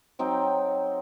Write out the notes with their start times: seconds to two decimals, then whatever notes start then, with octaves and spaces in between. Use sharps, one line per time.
0.19 F#3 C4 D#4 G5